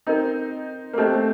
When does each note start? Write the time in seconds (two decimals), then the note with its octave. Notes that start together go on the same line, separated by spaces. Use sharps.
0.07 C4 D#4 A#4 D#5 A#5
0.93 A#3
0.98 A3 C4 G4 C5 D#5